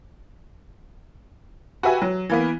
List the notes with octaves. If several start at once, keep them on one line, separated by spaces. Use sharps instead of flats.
F#4 G4 B4 E5 G#5
F#3
E3 A#3 B3